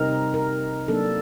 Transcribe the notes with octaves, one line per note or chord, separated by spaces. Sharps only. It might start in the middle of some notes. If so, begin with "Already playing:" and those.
Already playing: C3 G3 C4 D#4 A#4
A#4
F#3 A#3 D4 A4